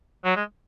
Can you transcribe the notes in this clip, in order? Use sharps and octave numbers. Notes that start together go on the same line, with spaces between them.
F#3
G#3